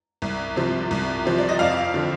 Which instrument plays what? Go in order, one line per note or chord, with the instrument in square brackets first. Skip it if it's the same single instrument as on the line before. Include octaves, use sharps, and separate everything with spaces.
[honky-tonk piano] C2
C3 F3
C2
C3 F3
D5
D#5
F2 F5
D3 F3